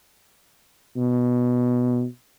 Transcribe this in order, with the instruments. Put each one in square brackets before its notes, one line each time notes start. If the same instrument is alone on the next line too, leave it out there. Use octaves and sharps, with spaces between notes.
[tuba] B2